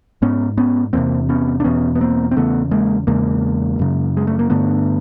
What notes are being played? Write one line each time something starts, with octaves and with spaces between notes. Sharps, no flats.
G#2 B3 C#4
B3 C#4
E2 C3 A#3 C4
B3 C#4
D4
E2 B2 B3 C#4
B3
A#3 C4
C4
E2 C#3 A3 B3
G#3 A#3
E2 C#3 G#3 A#3
F#2 C#3
G#3
A3
A#3
G2 D3 A3 B3